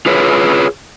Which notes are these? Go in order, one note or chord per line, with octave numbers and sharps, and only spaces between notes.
F4 G#4 B4 C#5